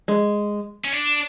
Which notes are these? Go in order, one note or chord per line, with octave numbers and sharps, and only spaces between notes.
G#3
C#4
D4